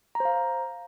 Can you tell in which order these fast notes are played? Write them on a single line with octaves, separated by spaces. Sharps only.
A#5 C5 F5